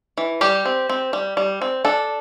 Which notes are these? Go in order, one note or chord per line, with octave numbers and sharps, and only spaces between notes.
E3
G3 G4
C4
C4
G3
G3
C4
D4 A4